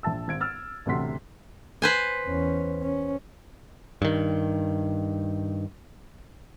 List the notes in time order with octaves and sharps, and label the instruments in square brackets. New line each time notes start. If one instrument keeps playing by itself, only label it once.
[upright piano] A#1 E5 A5 E6
G#1 G#6 D7
E6 F6 A6
A1 D2 C3 F#5 C6 B6
[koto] B4 C5 G#5
[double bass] E2 C#4
C#4
[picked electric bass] G2 D#3